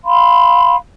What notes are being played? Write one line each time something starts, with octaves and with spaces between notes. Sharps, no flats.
F5 B5 C6